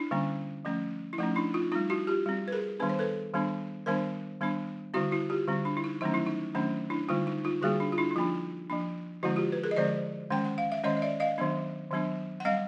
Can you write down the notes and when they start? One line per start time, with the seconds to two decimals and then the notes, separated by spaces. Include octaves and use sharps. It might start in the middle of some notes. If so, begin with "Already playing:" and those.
Already playing: D4 E4
0.11 D3 G3 A#3 C#4
0.65 F3 A3 C#4
1.13 E4
1.18 F3 A3 C#4 D#4
1.36 D4 E4
1.54 D#4 F4
1.72 G3 C4 D#4 F4
1.90 E4 F#4
2.07 F4 G4
2.26 G3 C4
2.48 B4
2.52 G#4 A#4
2.80 D#3 G3 B3 D4 B4
2.89 C5
2.99 A4 B4
3.34 D#3 G3 B3 D4
3.86 D#3 G3 B3 D4 A#4 C5
4.41 D#3 G3 B3 D4
4.94 D3 G3 C4 E4 F#4
5.11 E4 F#4
5.30 F4 G4
5.47 D3 G3 C4
5.65 D4
5.77 E4
5.84 D#4
6.01 D#3 F#3 A3 C#4 D#4
6.14 E4
6.26 D#4
6.55 D#3 F#3 A3 C#4 D4
6.90 D4 E4
7.09 D3 G3 A#3 D#4 F4
7.27 D#4
7.44 D#4 F4
7.62 D3 G3 A#3 F#4 G#4
7.80 D4
7.92 F4
7.98 D4 E4
8.11 E4
8.16 F3 A#3 D4 D#4 F4
8.70 F3 A#3 D4
9.23 D3 F3 G#3 C4 E4 F#4
9.36 F4 G4
9.52 B4
9.63 G#4 A#4
9.71 D#5
9.76 D3 F3 G#3 C4 C5 D5
10.30 D#3 G#3 C#4 G5
10.45 F#5
10.58 F5
10.72 E5
10.84 D#3 G#3 C#4 C#5 D#5
10.97 D#5
11.02 D5 E5
11.20 D#5 F5
11.38 D#3 F#3 B3 D4
11.91 D#3 F#3 B3 D4
12.40 F#5
12.45 G3 C4 D#5 F5